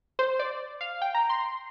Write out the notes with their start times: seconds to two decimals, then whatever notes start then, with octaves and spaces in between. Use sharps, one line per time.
0.19 C5
0.39 D5
0.81 F5
1.02 G5
1.15 A#5
1.29 C6